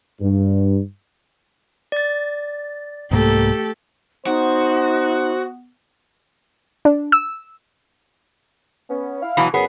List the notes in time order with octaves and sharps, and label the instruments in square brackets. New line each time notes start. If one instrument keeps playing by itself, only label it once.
[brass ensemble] G2
[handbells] D5 A6
[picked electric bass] C2 G#2 A#3 [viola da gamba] A3 G4 A4
[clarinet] B3 [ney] D#4 [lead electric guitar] F#4 [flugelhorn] C5
[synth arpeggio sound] D4
E6
[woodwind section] B3 C#4
E4 F5
[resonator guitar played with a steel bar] B2 E3 F#3
[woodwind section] F#2 [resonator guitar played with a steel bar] B3 G#4